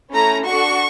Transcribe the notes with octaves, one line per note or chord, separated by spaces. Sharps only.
A3 C#4 E4 A#5
D4 F#4 A4 C#6